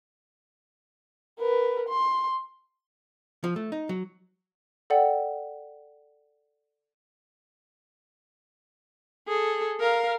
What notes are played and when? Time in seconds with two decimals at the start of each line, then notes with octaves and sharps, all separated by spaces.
1.39 A#4 B4
1.88 C6
3.44 F3
3.56 A3
3.72 D#4
3.89 F#3
4.90 A4 D5 F#5 G5
9.28 G#4 A4
9.80 A#4 F5